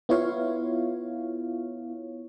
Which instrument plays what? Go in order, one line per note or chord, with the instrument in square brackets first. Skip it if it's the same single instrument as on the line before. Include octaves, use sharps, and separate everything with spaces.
[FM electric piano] B3 E4 F4 C#5 F5